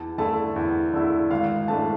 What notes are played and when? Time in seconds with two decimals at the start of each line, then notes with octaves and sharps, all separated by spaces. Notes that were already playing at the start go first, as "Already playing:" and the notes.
Already playing: E2 A5
0.18 D3 A3 E4 A5
0.56 E2
0.93 D3 A3 E4
1.31 G#1 F5
1.68 G#2 E3 A3 D4 A5